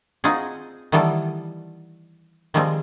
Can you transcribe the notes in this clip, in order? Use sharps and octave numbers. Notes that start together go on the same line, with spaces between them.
C4 D#4 F4 F#4 G#4
D#3 E3 G3 B3 A4
D#3 F3 G3 G#3 C4